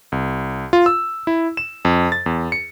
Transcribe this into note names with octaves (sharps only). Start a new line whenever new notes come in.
C2
F4
E6
E4
E7
F2
A6
E2
C#7